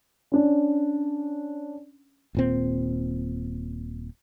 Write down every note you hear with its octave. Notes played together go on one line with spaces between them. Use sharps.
C#4 D4
D#1 A#2 C4